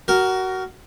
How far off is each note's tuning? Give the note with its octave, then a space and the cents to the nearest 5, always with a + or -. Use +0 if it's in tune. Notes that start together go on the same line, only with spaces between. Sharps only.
F#4 +20 A#4 +0